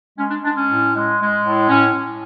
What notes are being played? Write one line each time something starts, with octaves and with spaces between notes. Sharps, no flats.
G#3 C#4
D4
G#3 D4
C#4
A2
G#3
G#3
A2
A2 C#4
A2